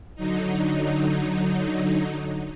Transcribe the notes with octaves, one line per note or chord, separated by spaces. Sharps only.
D3 F#3 D#4